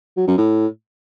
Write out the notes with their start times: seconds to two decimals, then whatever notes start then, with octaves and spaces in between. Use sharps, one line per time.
0.17 F#3
0.27 F#2
0.38 A2